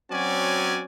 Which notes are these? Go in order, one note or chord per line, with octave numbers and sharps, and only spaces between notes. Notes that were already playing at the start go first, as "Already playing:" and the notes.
F#3 C4 C#4 F#4 D5 G#5